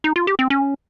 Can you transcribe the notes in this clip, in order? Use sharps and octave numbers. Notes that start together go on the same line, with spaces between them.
D#4
F4
G4
C4
C#4